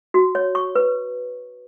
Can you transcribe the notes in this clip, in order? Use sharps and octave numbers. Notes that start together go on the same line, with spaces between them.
F#4
C#5
C#6
B4